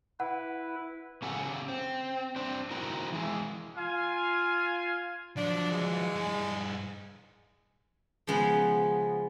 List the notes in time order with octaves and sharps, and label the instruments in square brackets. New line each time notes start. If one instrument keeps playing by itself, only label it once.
[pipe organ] E4 B4 [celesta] F#5
[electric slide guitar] C#3 C#4 G4 A4 F#5
C4
C4 D4
C4 D#4 E4 F#4 A#4
E3 G#3
[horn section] F4 F5 G#5
[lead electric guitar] F3 F#3 [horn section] D4
[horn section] E3 G#3
[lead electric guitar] G2 G#4
[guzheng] C#3 F3 G#3 B3